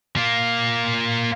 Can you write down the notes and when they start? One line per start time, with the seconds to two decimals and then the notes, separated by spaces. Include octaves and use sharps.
0.16 A#3 F4